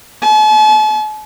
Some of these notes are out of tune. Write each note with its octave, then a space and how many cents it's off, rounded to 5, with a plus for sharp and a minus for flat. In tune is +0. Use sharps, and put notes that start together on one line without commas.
A5 -45